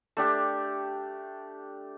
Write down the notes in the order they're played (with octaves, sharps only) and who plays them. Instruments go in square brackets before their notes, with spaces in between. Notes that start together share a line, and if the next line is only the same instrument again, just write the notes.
[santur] A3 D4 G4